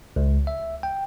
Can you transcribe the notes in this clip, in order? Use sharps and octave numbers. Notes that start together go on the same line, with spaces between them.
C#2
E5
G5